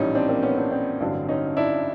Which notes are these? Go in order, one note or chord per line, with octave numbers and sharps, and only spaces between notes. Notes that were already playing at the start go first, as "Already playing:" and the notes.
Already playing: A#1 A2 E3 G3 C#4 D#4
C4 D4
A#3 C4
B3 C#4
C4 D4
C4 D4
A1 G2 D3 F#3
C#4 D#4
D4 E4